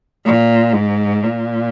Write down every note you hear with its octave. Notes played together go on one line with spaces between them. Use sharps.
A#2
G#2
A#2